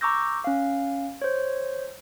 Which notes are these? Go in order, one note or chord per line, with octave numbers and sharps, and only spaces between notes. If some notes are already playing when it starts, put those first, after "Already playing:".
A#5 C#6 D6 E6 G6 A#6
C#4 F5
C5 C#5